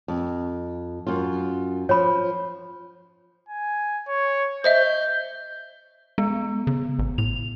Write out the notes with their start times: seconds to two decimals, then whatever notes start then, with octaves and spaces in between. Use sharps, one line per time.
0.08 F2
1.07 F#2 F4
1.89 F3 C#5 B5
3.49 G#5
4.08 C#5
4.64 C5 D#5 E5 G6
6.18 G#3 B3
6.67 C#3
6.99 A1
7.18 A2 F7